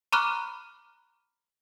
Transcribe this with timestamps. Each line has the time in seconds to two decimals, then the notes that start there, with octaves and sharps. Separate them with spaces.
0.12 A#5 B5 C#6 D6 F6 F#6